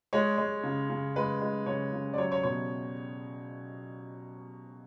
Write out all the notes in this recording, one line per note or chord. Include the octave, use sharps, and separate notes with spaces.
G#3 C#5
G#3
C#3
C#3
G#3 B4
G#3
C#3 C#5
C#3
D5
F#3 C#5
C#5
B2 C#5